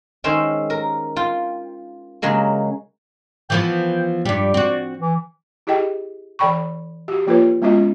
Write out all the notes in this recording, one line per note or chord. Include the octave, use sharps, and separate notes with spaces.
D#3 G#3 C#4 C5 E5 G5
A#4
F4 G5
C#3 F#3 G#3 A#3
E3 F3 B3 G5
G2 G3 D5
C4 F#4
E3
E4 G4 G#4 D#5 G5
E3 A4 D5 G5 B5 C#6
F#4 G4
F3 A#3 F4 A4 B4 C#5
G#3 B3 C#4 F4 F#4 D#5